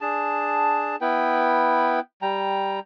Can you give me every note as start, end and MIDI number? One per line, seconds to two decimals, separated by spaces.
0.01 0.96 62
0.01 0.96 68
0.01 0.96 81
1.01 2.00 59
1.01 2.00 64
1.01 2.00 71
1.01 2.00 79
2.22 2.80 55
2.22 2.80 79
2.22 2.80 82